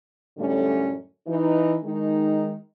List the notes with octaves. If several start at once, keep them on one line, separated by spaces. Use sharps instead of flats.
F#2 A2 D3 G3 A3 C#4
E3 D#4
D#3 G#3 D#4